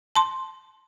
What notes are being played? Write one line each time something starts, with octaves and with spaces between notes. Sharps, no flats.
A5 C6